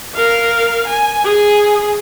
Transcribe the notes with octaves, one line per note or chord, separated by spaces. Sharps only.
A#4 F5
G#5
G#4